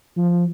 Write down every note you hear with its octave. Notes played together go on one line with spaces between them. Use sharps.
F3